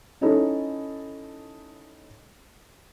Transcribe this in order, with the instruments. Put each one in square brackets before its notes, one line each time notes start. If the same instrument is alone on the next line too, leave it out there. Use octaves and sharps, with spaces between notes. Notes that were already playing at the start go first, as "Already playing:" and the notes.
[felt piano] C#4 D#4 E4 A4